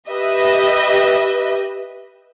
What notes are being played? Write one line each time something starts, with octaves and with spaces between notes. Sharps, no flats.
G4 B4 D#5 E5